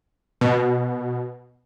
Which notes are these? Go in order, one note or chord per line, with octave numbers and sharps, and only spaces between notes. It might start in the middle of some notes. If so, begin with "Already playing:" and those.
B2